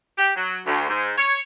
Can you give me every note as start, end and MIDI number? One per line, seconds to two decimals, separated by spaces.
0.18 0.31 67
0.36 0.59 54
0.65 0.88 38
0.89 1.11 44
1.17 1.40 73